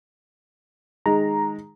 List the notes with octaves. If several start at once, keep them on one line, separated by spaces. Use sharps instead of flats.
D#3 G#3 A#5